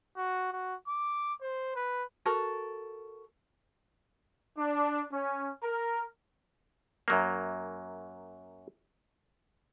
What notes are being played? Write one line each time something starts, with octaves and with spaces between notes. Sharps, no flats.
F#4
F#4
D6
C5
B4
F#4 A4 A#4
D4
C#4
A#4
F#2 F#3 A#3